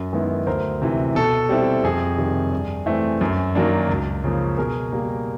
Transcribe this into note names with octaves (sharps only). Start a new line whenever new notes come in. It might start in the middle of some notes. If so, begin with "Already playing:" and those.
Already playing: F#2
D#3 G#3 B3 E4
D2 A#4 C5
C3 E3
B2 A4
G3 C4 E4
F2 G#4
C3 D#3 G3
G2
E3 A3 C4
F#2
D#3 F#3 A#3 D4
C#2
C#3 F3 A#3 C#4
B2 G#4 A#4
G3 A#3